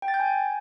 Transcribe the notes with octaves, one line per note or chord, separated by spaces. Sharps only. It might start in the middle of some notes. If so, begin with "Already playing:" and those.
G5
A6
G6
G#5